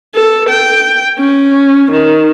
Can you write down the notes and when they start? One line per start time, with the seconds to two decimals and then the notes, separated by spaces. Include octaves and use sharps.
0.15 A4
0.49 G5
1.19 C#4
1.91 D#3